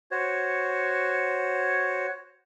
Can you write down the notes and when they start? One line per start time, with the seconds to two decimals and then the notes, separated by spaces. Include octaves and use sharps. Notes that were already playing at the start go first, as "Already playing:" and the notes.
0.11 F#4 C5 C#5